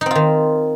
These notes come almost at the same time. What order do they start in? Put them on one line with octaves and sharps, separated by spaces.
D#4 C4 F4 D#3